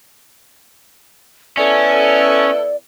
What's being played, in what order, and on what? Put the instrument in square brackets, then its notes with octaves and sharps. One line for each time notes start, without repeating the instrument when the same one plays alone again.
[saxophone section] B3 E4 A4 [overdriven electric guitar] C#4 [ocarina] D5